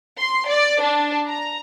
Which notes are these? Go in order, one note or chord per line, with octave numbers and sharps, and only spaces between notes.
C6
D5
D4
A#5